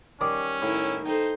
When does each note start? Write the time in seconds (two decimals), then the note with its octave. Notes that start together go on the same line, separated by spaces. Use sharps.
0.21 D#3 G3 C#4 D5 D#6
0.62 A2 D#3 E4
1.06 A3 D#4 E4 C5 G5